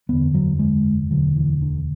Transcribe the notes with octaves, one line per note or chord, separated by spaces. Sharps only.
F#1 E2 D3 B3
F#3
G#3
E1 D2 D3 F#3
E3
D3